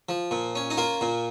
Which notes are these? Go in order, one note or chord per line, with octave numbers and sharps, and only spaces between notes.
F3
A#2
C#4
D#4
A#3 F4
A#2